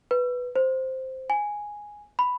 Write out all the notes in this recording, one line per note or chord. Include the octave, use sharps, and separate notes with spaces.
B4
C5
G#5
B5